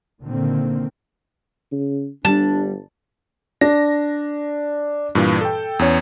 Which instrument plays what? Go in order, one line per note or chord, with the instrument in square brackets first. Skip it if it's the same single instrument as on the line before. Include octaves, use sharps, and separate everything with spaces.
[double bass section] A#2 D3 D#3 A#3 C4
[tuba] C#3
[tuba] G1 [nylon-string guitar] G3 [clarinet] D4 [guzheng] A5
[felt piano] D4 [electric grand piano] A#6
[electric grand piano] G2 A#2 E3
A4 G5
E2 C#4 C#5